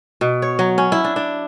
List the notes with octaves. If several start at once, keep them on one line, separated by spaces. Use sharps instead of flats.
B2
C#5
F#3
C#4
E4
D4
D4